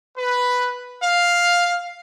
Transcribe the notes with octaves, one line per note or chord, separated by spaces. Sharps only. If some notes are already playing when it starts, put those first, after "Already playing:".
B4
F5